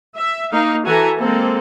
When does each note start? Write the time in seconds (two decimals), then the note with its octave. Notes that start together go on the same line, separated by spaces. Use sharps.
0.16 E5
0.52 A#3 D#4 F5
0.86 E3 F#4 A4 E5 G#5 A#5
1.18 G#3 A#3 C4 A4